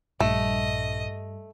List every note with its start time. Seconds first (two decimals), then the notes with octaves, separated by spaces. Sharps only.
0.20 A#1 G2 A3 D#5